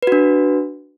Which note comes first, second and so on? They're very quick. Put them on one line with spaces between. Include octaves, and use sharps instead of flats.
B4 F#4 D4